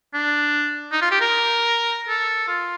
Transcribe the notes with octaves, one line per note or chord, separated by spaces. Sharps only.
D4
D#4
F4
G4
A#4
A4
F4